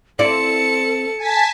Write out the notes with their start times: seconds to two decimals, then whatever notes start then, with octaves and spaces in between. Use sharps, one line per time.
0.19 C4 E4 A4 D5 A5 C#7
1.17 G#5 A5 B6